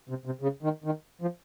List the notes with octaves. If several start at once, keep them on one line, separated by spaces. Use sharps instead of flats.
C3
C3
C#3
D#3
D#3
F3